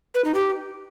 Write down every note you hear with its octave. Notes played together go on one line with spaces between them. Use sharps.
B4
D#4
G4